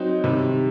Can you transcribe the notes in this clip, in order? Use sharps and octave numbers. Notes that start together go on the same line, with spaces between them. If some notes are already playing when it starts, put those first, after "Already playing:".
Already playing: F#3 C4 D#4
C3 D#3 G3